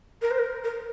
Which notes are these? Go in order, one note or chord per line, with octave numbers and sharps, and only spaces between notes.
A#4
C5
A#4
A#4